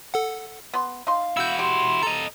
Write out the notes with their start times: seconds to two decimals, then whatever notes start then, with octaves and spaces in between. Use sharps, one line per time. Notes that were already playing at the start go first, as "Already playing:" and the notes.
0.14 A4 F#5
0.74 B3 C6
1.07 D#4 F5 C6
1.37 E4 F#4 E6 G6
1.59 G4 C6
2.03 A4 D#5 A#5